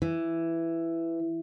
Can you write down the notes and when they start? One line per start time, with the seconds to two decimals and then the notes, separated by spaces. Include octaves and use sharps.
0.02 E3